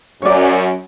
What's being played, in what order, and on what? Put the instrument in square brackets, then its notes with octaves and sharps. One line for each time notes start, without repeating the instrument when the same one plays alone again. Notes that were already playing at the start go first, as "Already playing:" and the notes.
[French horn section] F#2 [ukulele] C#5 D5